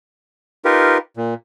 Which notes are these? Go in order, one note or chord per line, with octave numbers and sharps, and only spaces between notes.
D#4 F4 G4 A#4 B4
A#2